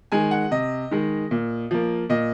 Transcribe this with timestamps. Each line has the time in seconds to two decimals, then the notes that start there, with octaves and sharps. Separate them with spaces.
0.12 D#3 G#3 G#5
0.31 F#5
0.51 C3 D#5
0.91 D#3 G#3
1.31 A#2
1.71 F3 A#3
2.10 A#2 D#5